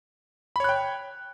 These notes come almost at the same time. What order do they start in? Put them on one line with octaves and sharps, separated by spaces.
B5 C#5 F#6 G5